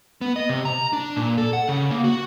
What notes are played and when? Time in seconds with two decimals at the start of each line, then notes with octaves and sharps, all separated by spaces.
0.21 B3
0.36 D#5
0.49 C3
0.65 A#5
0.93 D4
1.16 A#2
1.38 A4
1.53 F#5
1.69 C#3
1.90 A#3
2.04 F#4